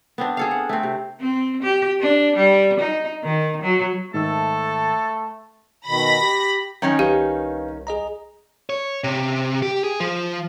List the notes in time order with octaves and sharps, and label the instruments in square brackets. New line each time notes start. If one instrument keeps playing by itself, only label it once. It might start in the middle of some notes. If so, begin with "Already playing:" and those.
[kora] B3 C4 D4
G#4 A4 F5
F#5
A3 C4
C3
[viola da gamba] C4
G4
D4
G3
D#4
D#3
F#3
[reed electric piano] G#2 D#3 E6 [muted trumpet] A3 [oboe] A4
[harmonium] B2 D#3 [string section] B5 A#6
[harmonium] G4
[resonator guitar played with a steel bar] D#3 C#4 D#4 [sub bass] F#3
[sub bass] C2 [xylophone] G4 [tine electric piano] B4 F5
[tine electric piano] G#4 D#5 A#5
[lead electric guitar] C#5
C3
G4
G#4
F3